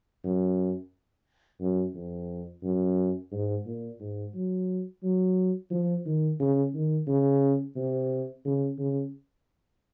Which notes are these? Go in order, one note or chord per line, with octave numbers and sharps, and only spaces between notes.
F#2
F#2
F2
F#2
G#2
A#2
G#2
F#3
F#3
F3
D#3
C#3
D#3
C#3
C3
C#3
C#3